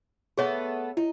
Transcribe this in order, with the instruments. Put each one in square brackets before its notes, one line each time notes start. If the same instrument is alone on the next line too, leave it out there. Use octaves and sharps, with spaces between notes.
[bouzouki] A3 B3 A4 [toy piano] G#4 C#5 E5
[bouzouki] D#4 [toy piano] E4